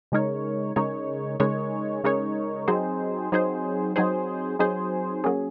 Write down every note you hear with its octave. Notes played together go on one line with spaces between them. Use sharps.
C#3 G#3 D#4 A#4 C#5
C#3 G#3 D#4 A#4 C#5
C#3 G#3 D#4 A#4 C#5
C#3 G#3 D#4 A#4 C#5
F#3 C4 D#4 G#4 C5
F#3 C4 D#4 G#4 C5
F#3 C4 D#4 G#4 C5
F#3 C4 D#4 G#4 C5
F#3 A#3 C#4 G#4